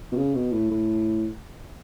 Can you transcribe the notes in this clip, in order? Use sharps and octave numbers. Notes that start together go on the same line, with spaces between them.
B2
C#3
B2
A2
A2